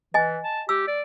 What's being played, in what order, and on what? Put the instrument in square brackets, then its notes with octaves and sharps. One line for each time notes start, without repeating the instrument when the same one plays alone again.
[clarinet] E3 [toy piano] D#5 G#5
[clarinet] A5
[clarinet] G4 [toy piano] E6
[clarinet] D5